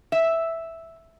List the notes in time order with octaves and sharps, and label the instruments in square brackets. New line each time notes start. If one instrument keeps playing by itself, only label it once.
[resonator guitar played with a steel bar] E5